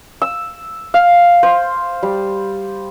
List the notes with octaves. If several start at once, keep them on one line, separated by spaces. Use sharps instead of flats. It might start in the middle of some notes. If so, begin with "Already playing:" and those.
E6
F5
C5
G3